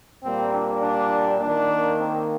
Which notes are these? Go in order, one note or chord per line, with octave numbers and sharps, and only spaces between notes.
A#2 G3 A#3 C4
D4
D4
D#3 A#3 D4
C4